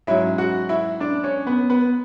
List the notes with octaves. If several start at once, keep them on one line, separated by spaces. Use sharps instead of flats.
G#2 F#3 C#4 E4 E5
F#4 F#5
E4 E5
D4 D5
C#4 C#5
B3 B4
B3 B4